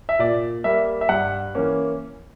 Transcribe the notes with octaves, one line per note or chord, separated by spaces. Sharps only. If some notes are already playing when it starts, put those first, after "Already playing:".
E5
A#2 D5
G3 A#3 E5
E5
G2 F#5
E3 A#3 C#4